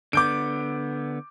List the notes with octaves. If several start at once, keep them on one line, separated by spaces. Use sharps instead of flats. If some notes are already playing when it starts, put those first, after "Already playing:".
D3 B3 D6 G6 D7